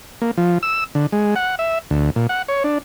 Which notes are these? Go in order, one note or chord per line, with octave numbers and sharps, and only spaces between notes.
A#3
F3
E6
D3
G#3
F#5
E5
D2
A#2
F#5
C#5
D4